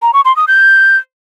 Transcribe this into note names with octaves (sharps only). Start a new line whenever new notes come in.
A#5
C#6
C6
D#6
G6